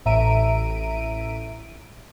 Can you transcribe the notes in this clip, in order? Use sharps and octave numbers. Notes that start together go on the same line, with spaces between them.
A1 A2 E5 A#5 D7 D#7